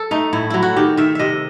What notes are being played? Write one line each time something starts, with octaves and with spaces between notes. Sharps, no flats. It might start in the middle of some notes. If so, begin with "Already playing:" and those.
Already playing: A4
A3 D#4
A2 E4
F#3 E4
F#4
D#3 G4
D#3 E5
C3 D#5 E5